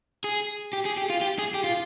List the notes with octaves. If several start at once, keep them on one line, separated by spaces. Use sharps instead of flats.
G#4
G4
G#4
G4
F4
G4
G#4
G4
F4